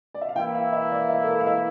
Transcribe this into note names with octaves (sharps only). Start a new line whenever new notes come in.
D5
E5
F5
E3 A#3 E4 G5
F5
E5
D5
E5
A4
A#4
F5
E5